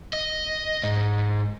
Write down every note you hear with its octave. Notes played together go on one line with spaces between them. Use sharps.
D#5
G#2